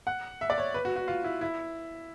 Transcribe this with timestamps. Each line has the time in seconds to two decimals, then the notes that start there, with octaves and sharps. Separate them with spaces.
0.07 F#5
0.41 E5
0.50 D5
0.58 C#5
0.74 B4
0.85 F#4
0.96 F#4
1.08 F4
1.24 E4
1.41 E4